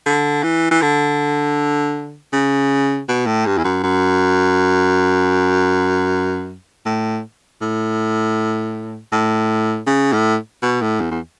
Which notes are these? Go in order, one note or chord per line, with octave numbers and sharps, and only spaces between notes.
D3
E3
E3
D3
C#3
B2
A2
G2
E2
F#2
F#2
A2
A2
A2
C#3
A2
B2
A2
E2
E2